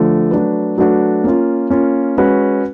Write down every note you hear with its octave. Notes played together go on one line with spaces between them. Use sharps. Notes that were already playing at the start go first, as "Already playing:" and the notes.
Already playing: D3 F3 A3
F#3 A3 D4 F#4 B4
F#3 A3 D4 F#4 B4
A#3 C#4 F4
A#3 C#4 F4
G#3 C#4 F#4 B4